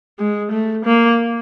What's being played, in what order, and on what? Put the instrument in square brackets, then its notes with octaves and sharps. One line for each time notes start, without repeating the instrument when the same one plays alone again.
[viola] G#3
A3
A#3